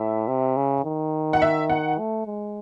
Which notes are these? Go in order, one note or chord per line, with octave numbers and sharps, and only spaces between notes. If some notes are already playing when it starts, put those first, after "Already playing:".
Already playing: A2 E5
C3
C#3
D#3
F#5
E5
F#5
A3
G#3